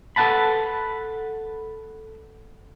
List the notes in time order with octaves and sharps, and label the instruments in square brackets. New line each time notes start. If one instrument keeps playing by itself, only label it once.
[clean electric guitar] A4 B4 F#5 A5 B5